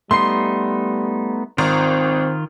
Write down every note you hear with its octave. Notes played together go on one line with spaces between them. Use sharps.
G3 A3 B3 D#4 C6 C7
G#1 D#3 C4 F4